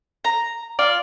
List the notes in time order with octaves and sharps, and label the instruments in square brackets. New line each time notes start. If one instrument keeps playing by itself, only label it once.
[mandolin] A#5
[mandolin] F4 [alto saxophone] D5